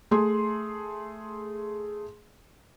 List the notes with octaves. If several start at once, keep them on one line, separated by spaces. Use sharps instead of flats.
A3 G#4 C6